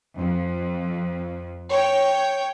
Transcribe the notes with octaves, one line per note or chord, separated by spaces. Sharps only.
F2
C#5 G5